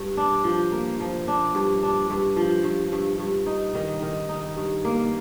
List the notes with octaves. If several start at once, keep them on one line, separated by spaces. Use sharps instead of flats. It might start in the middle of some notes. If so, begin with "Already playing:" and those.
Already playing: G2
D4
F3
A#3
F3
D4
G2
D4
G2
F3
G2
G2
G2
D#4
D#3
D#3
D#4
G2
A#3